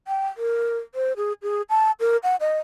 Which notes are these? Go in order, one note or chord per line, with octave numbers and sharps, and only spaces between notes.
G5
A#4
C5
G#4
G#4
A5
A#4
F#5
D#5